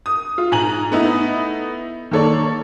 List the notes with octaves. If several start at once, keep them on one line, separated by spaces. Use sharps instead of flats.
D#6
F4
G#2 G#5 A#5 F#7
A3 B3 D#4 E4
D#3 A#3 A4 C#5 D5